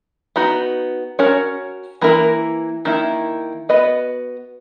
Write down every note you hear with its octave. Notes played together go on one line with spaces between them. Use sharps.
B3 D#4 F#4
C#4 F#4 A#4 C#5
E3 A#3 E4 A#4
D#3 A#3 E4
B3 F#4 B4 D#5